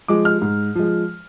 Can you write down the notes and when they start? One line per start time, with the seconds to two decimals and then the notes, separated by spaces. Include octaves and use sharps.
0.08 F3 G#3 D6
0.25 F6
0.42 G#2
0.75 F3 G#3